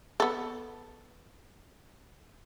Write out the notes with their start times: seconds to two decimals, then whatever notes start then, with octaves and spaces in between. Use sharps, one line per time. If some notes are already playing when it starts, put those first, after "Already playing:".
0.20 B3 A4